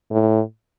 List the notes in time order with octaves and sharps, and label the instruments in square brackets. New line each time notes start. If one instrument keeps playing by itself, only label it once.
[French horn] A2